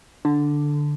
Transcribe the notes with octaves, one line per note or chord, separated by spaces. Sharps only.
D3